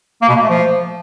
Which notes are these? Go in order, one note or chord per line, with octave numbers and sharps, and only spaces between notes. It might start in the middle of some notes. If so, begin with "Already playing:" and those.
A#3
B2
A#3
A3
F3